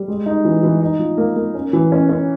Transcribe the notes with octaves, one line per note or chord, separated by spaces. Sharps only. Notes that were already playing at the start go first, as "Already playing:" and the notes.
Already playing: G3
G#3
D#4
E3
E3
D#4
F3
A#3
A#3
C#4
E3
C#4
C#4